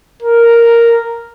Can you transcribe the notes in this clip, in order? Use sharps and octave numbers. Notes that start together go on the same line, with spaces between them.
A#4